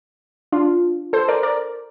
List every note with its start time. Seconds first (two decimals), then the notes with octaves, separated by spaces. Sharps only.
0.52 D4 F4
1.13 A4 C5
1.28 A#4 D5
1.43 A#4 D5